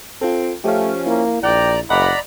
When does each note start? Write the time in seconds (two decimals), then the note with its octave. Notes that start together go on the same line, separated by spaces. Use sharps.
0.21 C4 F4 A4
0.64 F3 A3 C#4 G4 F5
1.07 A#3 E4
1.43 A#1 D5 G5 A#5
1.90 F#1 D5 D#5 F#5 A#5 B5